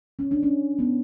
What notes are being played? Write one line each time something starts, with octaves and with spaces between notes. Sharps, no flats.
C#4
D4
C#4
B3